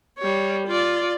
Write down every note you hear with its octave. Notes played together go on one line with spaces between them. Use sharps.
G3 C#5
F4 D5